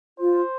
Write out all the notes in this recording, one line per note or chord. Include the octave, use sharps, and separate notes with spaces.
F4 C5